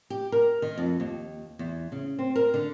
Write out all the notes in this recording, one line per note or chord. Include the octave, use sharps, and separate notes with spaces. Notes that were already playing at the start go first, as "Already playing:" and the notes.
G4
A#4
D#3
F2
D#2
E2
C#3
C4
A#4
D3